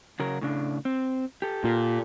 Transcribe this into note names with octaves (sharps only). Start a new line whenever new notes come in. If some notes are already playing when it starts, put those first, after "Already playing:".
C#3 F#3 A#4
A2 C#3 D4
C4
G4 A4
A#2